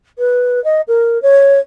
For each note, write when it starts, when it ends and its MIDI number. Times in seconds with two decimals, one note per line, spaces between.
0.18 0.63 71
0.64 0.81 75
0.88 1.21 70
1.22 1.59 73